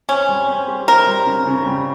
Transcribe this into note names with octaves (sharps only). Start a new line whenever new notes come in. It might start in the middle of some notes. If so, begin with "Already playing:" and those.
C4 C#4
G3
C4
G4
C4 A#4
G3
C#3
C#3
G3